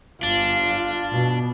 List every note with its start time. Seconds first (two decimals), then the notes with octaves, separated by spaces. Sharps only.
0.23 G1 D4 F4
1.13 B2